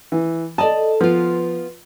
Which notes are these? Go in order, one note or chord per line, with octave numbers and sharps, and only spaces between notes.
E3
A4 D5 D#5 A5
F3 B3 F4